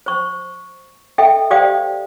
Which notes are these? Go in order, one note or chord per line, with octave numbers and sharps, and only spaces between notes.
C5 C#6
A4 D#5 E5 G5
G4 C5 D5 F5 G5 D#6